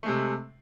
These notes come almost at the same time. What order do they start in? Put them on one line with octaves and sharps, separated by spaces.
A3 G#3 C3